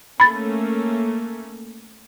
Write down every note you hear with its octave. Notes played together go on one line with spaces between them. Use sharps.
A3 A#3 C#4 B5 A6